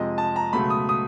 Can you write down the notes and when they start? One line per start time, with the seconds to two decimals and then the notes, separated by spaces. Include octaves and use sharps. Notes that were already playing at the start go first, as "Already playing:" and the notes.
Already playing: F2 C3 F3 G#3 D#5
0.18 A5
0.36 A#5
0.53 C#2 B2 F#3 A3 B5
0.70 D#6
0.89 D#6